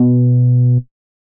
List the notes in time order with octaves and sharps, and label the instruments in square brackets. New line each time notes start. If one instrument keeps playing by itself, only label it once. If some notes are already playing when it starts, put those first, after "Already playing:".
Already playing: [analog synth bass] B2